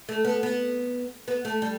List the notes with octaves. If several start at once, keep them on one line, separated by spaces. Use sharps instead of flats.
A3
B3
B3
B3
A3
G3